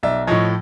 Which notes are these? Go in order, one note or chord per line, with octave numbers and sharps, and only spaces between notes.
B1 D5 E5
A2 F3 C#5 D#5